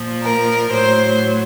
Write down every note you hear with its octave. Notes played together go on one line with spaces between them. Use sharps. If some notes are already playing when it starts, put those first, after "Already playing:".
Already playing: A#2 F3
A#4
A2 F#3 C5